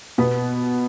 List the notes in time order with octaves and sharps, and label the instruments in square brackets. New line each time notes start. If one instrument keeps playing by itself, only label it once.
[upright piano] B2 B3